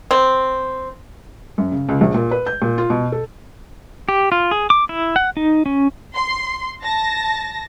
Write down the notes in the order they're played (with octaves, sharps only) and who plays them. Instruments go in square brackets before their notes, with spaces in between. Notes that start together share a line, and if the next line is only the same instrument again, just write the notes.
[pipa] C4
[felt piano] F#2
C#3
C#2
A#1
A#2
B4
G6
A#2
F4
B2
A4
[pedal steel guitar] G4
F4
G#4
D6
E4
F#5
D#4
C#4
[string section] C6
A5 A#6